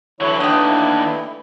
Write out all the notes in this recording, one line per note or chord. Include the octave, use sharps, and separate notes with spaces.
D3 E3 F#3 A3 E4 C#5
D#2 D4 G5 D#6